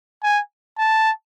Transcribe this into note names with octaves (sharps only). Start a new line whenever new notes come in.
G#5
A5